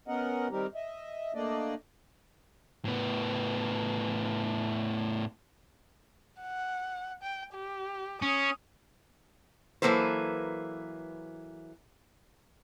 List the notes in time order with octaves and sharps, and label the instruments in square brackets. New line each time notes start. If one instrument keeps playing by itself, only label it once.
[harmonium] B3 C#4 A#4 D#5 F#5
D#3 G3 C4 D#4 G4 A#4
D#5 E5
A3 A#3 D4 D5 D#5
[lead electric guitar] A2 B3
[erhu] F#5
G5
G4
[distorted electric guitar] C#4 [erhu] D#6
[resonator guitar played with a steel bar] E3 F#3 A#3 A4 B4 C5